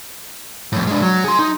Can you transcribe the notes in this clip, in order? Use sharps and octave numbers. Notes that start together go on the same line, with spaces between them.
F2 A2
G#3 D4
F#3
G#4 C6
D#4